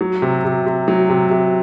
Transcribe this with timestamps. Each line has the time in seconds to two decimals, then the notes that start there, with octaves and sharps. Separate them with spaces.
0.01 F#3
0.22 C3
0.45 C3
0.66 C3
0.88 F#3
1.10 C3
1.31 C3